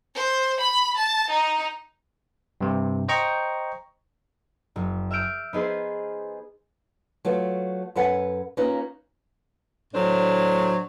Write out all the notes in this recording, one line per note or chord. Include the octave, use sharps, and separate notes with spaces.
C5
B5
A5
D#4
G2 C3
C5 D#5 G5 A#5 C#6
F#1
E5 E6 F6 G6 D7
B3 D#4 G#4 B4 C5
F#3 A3 F4 B4
F#2 A4 B4 F#5 G#5
A#3 C#4 D#4 F4 B4
A2 F#3 D4 C5